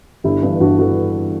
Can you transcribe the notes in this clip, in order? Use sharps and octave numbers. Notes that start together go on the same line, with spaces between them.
G1 E4 G4
G2 E3
G1 D4 F#4
E3 F#4 A4